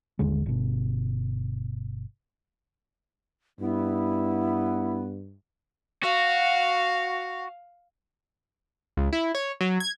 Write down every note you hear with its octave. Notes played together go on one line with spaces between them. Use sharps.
G1 D#2 D3 G#3
G1 B2
G2 B3 E4
F#4 F5
C#2
E4
C#5
F#3
G#6